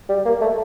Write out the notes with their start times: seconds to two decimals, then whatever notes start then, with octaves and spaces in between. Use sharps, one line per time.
0.09 G3
0.25 A#3
0.41 A3